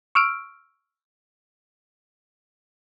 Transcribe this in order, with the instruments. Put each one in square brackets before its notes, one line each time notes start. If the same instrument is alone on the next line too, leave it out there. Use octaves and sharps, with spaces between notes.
[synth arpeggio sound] C#6 E6 F6 D7